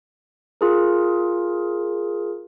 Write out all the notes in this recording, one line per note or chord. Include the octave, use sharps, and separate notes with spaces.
F4 G#4 A#4